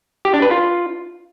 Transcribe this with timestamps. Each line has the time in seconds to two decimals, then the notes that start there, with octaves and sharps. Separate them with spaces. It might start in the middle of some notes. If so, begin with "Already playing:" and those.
0.25 G4
0.34 D4
0.42 B4
0.51 F4